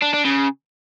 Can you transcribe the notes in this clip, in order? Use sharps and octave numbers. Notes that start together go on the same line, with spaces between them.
D4
D4
C#3